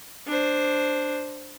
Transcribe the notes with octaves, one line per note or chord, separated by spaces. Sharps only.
D4 C5